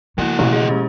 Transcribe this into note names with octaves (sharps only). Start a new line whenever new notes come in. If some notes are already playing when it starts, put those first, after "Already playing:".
C#2 F3 A#3 B3 E4 F#4
A1 B2
G#4 D#5
G#3 C#4 G4